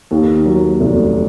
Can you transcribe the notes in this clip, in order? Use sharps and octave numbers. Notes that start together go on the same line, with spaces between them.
D#2
F#3
F1